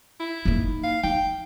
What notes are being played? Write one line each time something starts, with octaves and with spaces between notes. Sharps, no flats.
E4
A#3 D#4
F5
D#4 G5